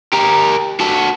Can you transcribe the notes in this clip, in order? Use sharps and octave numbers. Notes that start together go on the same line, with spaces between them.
G4 A#4
F#4 A4